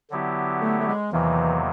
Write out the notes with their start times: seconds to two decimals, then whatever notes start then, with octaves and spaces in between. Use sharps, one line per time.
0.10 D3 F#3 B3 E4 G4
0.61 A3
0.79 A3
0.87 G#3
1.12 E2 C3 D#3 E3 F#3 A#3